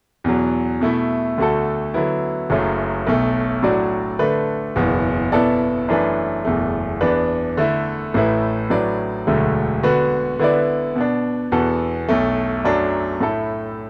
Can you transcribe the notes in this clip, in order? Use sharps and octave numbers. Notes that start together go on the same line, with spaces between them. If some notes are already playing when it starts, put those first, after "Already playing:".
E2 B2 F#3
B2 A3 E4
D2 D3 A3 F#4 A4
D3 F#3 B3 E4
F#1 F#2 F#3 A3
B1 B2 A3
A2 F#3 D4 F#4 D5
D3 A3 D4 B4
F#1 E2 B2 B3
B2 B3 E4 A4 D5
F#2 E3 A3 D4 B4
F#1 E2 B2 A3
E2 E3 B3 D4 B4
D3 A3 E4
A1 A2 A3 E4 B4
A2 F#3 D4 B4 D5
E1 D2 D3 F#3 A3
D3 B3 F#4 B4
D3 B3 E4 B4 D5
B2 B3 D4
E2 B2 B3 F#4 A4
B1 B2 A3
F#2 F#3 A3 D4
A2 A3 E4 A4